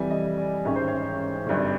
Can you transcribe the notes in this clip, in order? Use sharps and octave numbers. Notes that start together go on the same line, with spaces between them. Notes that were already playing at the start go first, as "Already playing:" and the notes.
Already playing: F2 C3 E3 G3 G#5
D#5
D5
A1 G#2 D#3 G#3 C#4 C#5
C5
C#5
G#1 G2 D3